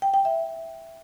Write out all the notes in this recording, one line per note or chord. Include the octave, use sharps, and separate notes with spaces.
G5
G5
E5